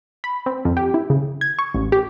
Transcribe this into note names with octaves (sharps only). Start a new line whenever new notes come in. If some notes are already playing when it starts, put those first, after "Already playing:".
B5
C4
F2
G4
E4
C#3
G#6
C#6
A1
G4